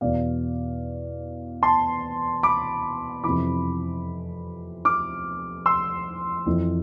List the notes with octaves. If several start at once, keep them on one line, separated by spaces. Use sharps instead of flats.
E2 B2 D5 F5
A5 C6
B5 D6
F2 C3 E3 B5 D6
D6 F6
C6 E6
F2 E3